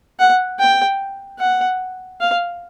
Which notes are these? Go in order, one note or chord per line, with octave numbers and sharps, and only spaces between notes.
F#5
G5
F#5
F5